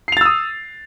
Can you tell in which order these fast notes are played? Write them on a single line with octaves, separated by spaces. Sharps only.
C7 F7 A6 E6 D#6